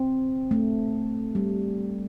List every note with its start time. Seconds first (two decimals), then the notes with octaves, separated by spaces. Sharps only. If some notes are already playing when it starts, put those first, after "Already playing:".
Already playing: C4
0.51 A3
1.35 G3